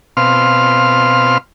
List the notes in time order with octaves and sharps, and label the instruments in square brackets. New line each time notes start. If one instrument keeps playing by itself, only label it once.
[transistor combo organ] B2 C4 F5 C6 F6